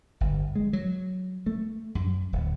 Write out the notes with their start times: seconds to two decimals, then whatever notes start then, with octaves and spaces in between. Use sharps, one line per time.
0.21 G1
0.55 G#3
0.73 F#3
1.46 A3
1.95 F#2
2.32 D1